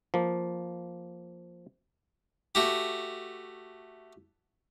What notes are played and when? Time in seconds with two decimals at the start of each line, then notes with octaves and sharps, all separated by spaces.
0.14 F3 A#3
2.55 A3 F#4 G4